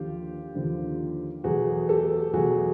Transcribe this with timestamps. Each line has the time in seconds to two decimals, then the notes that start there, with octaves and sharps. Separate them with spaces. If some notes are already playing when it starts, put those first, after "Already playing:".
Already playing: D#2 D3 F3 F4 G4
0.55 D#2 D3 F3
1.44 E2 B2 F#3 A3 F#4 G#4
1.89 G4 A4
2.33 E2 B2 F#3 A3 F#4 G#4